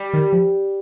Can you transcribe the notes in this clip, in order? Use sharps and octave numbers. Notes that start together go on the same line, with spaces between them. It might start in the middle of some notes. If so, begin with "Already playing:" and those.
Already playing: G3
D#3
F3